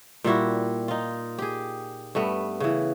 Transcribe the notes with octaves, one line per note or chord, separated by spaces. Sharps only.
A#2 G3 E4 F#4
D#4 F4
G4 G#4
G2 A3 B3
C#3 E3